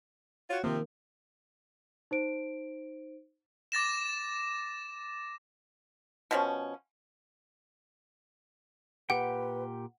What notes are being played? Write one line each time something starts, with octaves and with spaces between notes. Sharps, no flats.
F4 F#4 C#5
C3 D#3 F3 A#3 C4
D#4 C5 D7
D6 A6 A#6 E7
B2 F3 C#4
A#2 G4 B4 F#5 G5